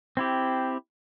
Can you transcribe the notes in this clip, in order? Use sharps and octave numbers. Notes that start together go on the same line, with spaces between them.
C4 E4 G4